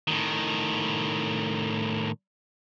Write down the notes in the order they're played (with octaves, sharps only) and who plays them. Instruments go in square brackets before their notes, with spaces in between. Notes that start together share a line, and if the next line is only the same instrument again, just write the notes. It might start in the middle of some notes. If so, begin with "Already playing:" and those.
[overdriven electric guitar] A2 D#3